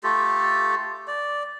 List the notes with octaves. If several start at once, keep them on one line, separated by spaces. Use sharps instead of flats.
A3 F4 G4 A4
D5